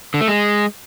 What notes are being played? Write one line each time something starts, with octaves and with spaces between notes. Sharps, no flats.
D3
A3
G#3